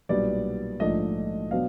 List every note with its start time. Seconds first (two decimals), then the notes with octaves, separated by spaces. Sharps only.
0.09 B1 A#2 G3 B3 D4 D5
0.80 A#1 G#2 F3 A3 D4 D#5
1.51 B2 F#3 B3 D4 F5